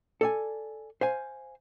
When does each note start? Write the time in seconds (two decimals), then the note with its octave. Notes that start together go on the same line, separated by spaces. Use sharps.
0.21 A4 D5 G#5
1.01 C5 F5 G#5